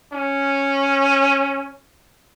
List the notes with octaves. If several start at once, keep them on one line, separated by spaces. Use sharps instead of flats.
C#4